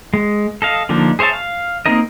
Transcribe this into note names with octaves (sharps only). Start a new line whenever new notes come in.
G#3
A4 D#5 F5
D3 F3 A#3 D4 D#4
G#4 C5 C#5 E5 A5
F5
A#3 C4 D#4 A#4 D#5